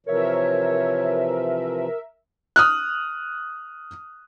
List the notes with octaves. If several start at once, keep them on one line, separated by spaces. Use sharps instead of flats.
C3 E3 F3 A#4 C#5 E5
D#6 F6 F#6